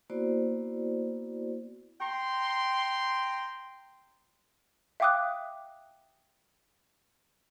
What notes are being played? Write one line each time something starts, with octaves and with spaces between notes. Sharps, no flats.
A#3 B3 E4 F#4 C5 D5
G5 A#5 C6
E5 F5 G5 D6 D#6 F#6